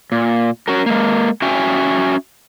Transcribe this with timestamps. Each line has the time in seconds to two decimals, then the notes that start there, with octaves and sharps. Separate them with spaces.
0.12 A#2
0.68 C#4 F#4 A#4
0.86 G#3 A#3
1.42 C#4 F#4 E5 G5 G#5